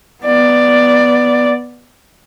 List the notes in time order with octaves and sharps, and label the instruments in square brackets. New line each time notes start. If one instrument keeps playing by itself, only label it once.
[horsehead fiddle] B3 D5